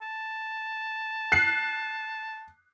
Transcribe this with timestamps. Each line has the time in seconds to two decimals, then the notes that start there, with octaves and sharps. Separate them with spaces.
0.02 A5
1.32 F#6 C7